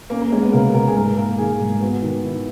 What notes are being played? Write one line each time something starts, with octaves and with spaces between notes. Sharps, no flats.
A#3 C#4
A#3
G#3 C#4
B3
C#3 A#4
C#3 A#4
G#4
G#2 A#4
A#3 A#4
D#3 G#4
G#2
B3 F#4
D#3
D#3 E4